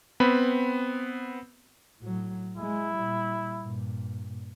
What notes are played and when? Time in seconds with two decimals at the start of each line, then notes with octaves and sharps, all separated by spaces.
0.20 B3 C4 B5
2.00 A2 F#3
2.57 G#3 E4
2.95 A#2 G3
3.62 G2 A#2